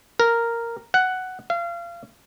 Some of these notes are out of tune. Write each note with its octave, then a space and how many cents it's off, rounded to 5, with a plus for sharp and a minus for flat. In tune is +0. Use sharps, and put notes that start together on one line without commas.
A#4 -5
F#5 +5
F5 -30